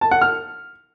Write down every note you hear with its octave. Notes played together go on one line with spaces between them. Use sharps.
A5
F#5
F6